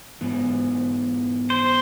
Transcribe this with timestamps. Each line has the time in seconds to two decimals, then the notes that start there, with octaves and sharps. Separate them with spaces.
0.21 G#2 E3 B3
1.50 C5